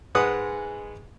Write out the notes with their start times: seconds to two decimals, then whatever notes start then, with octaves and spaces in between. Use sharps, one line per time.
0.15 G#2 G#3 B4 F#5 D#6